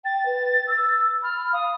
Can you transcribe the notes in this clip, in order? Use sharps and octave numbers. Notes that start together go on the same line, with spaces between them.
G5 A6
B4
E6
B5 F6
F5 D#6